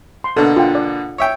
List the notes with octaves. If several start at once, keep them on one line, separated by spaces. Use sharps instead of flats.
C6
B2 D3 A#3 A4
F4 F#5 G5
D5
C#5 E5 G5